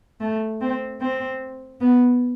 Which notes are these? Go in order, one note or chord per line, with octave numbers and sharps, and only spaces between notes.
A3
C4
C4
B3